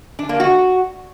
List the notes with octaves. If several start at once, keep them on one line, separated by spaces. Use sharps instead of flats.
D4
A#3
F#4